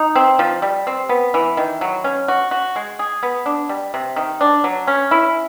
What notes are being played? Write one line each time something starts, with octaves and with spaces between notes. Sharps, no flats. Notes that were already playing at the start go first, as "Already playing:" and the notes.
Already playing: D#4
C4
F3
G3
C4
B3
E3
D#3
F#3
C#4
F#4
F#4
G#3
G#4
B3
D4
G3
C3
D#3
D4
F#3
C#4
E4